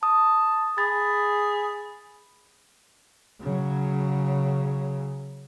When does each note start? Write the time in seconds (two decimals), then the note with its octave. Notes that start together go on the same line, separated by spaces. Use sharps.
0.03 A5 D#6
0.78 G#4 B5 A6
3.41 C#3 F#3